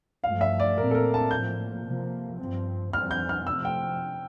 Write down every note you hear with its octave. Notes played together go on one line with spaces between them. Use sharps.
G2 F3 A3 F5
E5
D5
A#2 A3 C4 A#4
A4
A#4
A5
A2 F3 A#3 G6
C3 F3 A#3
G2 F3 C4
F2 E3 G3 C4 F6
G6
F6
C3 F3 A3 C4 E6
G5